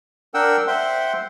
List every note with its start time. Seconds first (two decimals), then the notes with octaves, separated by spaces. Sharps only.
0.34 D4 A#4 F#5 G5 E6
0.67 C5 E5 F#5 G5 C6